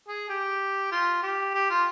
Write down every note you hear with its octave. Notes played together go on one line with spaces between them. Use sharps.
G#4
G4
F4
G4
G4
F4